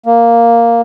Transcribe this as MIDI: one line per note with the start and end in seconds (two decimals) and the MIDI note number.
0.06 0.81 58